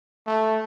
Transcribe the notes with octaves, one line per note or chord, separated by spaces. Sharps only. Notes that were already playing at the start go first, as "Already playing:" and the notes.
A3